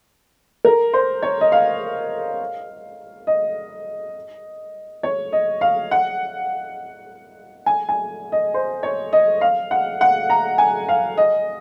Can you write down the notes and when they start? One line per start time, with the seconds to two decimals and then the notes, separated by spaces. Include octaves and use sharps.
0.65 A#4
0.93 C5
1.22 C#5
1.41 D#5
1.52 F5
3.27 D#5
5.03 C#5
5.33 D#5
5.61 F5
5.91 F#5
7.66 G#5
7.89 G#5
8.32 D#5
8.54 C5
8.83 C#5
9.13 D#5
9.41 F5
9.71 F#5
10.01 F#5
10.30 A#5
10.58 G#5
10.88 F5
11.18 D#5